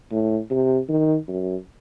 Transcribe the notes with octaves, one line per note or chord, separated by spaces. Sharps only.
A2
C3
D#3
F#2